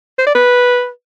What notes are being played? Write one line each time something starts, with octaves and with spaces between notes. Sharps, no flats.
C5
D5
B4